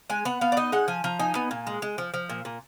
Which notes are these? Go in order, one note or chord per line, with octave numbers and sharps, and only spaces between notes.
G#3 G#5
B3 F#5
B3 F5
D5
D#4 D#5
G#3 F#5
F3 G#5
F3 A#5
D#4 G#5
B3 G#5
A#2
G#3
G#3
F3
F3
A#2
A#2